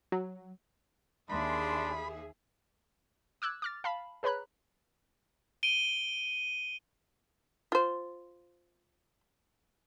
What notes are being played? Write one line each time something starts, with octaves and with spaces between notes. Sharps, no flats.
F#3
D#2 D4 G#4 E5 B5 C6
D6 E6 F#6 G#6
D6 F6 A6
F5 A5 B5
G#4 B4 C#5 A#5 B5 F#6
D7 D#7 G7
F4 C5